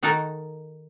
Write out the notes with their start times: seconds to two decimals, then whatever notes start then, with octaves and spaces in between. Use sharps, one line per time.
0.03 D#3 D#4 F#4 A4 A#4 A5